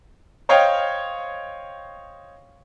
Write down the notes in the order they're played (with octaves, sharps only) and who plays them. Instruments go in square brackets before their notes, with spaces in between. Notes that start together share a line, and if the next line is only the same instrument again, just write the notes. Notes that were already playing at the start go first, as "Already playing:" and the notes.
[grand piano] C5 C#5 D#5 F5 G5